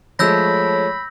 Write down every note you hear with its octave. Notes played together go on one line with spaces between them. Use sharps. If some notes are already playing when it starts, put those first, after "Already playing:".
F3 G#3 A3 C#5 B5 E6 G6 A#6